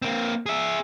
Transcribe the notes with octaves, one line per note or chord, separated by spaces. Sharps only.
A#3 C4
G#4 E5